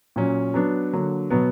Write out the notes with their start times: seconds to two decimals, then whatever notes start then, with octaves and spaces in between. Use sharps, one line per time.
0.16 A#2 F#3 C#4
0.54 F#3 B3 D4
0.93 D3 F#3 A#3
1.30 B2 F#3 B3